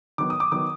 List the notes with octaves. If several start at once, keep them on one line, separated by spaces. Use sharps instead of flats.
D#3 F#3 B3 D6
D#6
D6
D#3 F#3 B3 D6